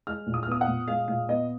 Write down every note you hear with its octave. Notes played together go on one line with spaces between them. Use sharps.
G#3 F6
A#2
D#6
F6
B3 D#6
F#5
A#2
G#3 F5
A#2 F5
B3 D#5